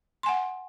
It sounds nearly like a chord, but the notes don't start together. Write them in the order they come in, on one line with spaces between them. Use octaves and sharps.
C6 G#5 F#5